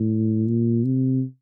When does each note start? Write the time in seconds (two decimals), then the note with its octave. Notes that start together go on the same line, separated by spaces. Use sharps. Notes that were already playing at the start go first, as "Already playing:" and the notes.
Already playing: A2
0.48 A#2
0.85 C3